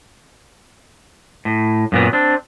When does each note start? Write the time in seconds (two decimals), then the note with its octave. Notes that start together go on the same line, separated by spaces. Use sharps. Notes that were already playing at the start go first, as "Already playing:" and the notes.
1.45 A2
1.92 F#2 A#2 B3
2.13 C4 D4